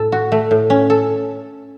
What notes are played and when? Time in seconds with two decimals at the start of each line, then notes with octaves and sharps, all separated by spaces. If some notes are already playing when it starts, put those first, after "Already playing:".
Already playing: A2 A4
0.12 F#4
0.32 A3
0.51 A2
0.70 C#4
0.90 A4